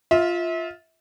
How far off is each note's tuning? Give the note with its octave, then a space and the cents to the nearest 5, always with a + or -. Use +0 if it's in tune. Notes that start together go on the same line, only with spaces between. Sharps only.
F4 +0 E5 -30